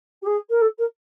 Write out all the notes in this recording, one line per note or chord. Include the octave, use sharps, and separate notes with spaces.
G4
G#4
A#4
A4
A#4